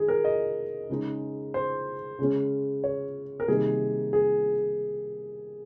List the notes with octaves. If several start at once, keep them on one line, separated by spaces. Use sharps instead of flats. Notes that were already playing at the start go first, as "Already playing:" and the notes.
Already playing: D#3 G#3 D#4 G#4
A#4
D#5
C#3 G#3 D#4
C5
C#3 G#3 C#4
C#5
A#4
C3 D#3 G3 A#3 D#4 G#4
G#4